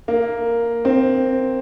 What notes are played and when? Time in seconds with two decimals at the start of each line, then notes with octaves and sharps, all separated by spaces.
0.08 A#3
0.85 C4